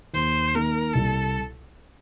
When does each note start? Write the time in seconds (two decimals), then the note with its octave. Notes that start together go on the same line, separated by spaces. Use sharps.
0.14 D#2 C5
0.55 D#3 A#3 A#4
0.94 C2 A4